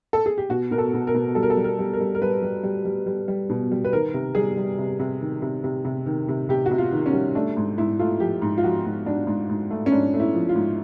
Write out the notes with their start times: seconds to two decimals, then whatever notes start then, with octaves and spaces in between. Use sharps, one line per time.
0.13 A4
0.26 G#4
0.38 G4
0.49 B2 F#4
0.71 B2 A#4
0.78 A4
0.93 B2
1.07 A#4
1.14 B2
1.35 G3 A4
1.43 A#4
1.50 A4
1.57 G3
1.64 A#4
1.79 G3
1.93 A#4
2.00 G3
2.15 A#4
2.22 G3 B4
2.42 G3
2.63 G3
2.85 G3
3.06 G3
3.28 G3
3.50 B2
3.71 G3
3.84 B4
3.93 D#3 A#4
4.14 C3
4.35 G3 G#4
4.57 G3
4.78 C3
4.99 C3
5.21 D#3
5.42 C3
5.64 C3
5.85 C3
6.06 D#3
6.28 C3
6.49 C3 G4
6.66 F#4
6.71 C3
6.78 F4
6.92 D#3
7.06 C#4
7.13 G3
7.35 A3 D4
7.57 G#2
7.78 G#2 E4
7.99 A3 F4
8.20 F3 G4
8.42 G#2
8.58 F4
8.64 F3 F#4
8.85 G#2
9.06 G#2 D4
9.27 G#2
9.50 G#2
9.71 A3
9.86 C#4
9.92 G#2 D4
10.14 A3
10.20 E4
10.35 F3
10.49 F4
10.56 G#2